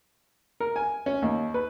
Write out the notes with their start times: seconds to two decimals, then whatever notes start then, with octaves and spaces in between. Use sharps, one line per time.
0.60 A#4
0.76 G#5
1.06 C#4
1.22 D#2
1.54 B4